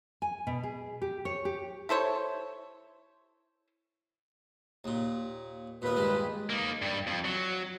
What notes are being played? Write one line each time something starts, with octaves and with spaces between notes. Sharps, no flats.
G#5
B2
G#4
G4
C#5
G4
E4 A4 C5 C#5
D#2 A#2
D#2 A#2 B3 B4
G2 D#3 G#3
A#3 D#4
G2 G3
F2
F#3